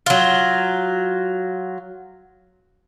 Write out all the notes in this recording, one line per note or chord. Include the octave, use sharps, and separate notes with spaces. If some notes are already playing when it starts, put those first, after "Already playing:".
F#3 F4